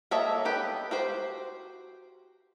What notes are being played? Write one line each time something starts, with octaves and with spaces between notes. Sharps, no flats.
A#3 A4 C#5 D#5 E5
B3 G4 B4
F#4 G4 C5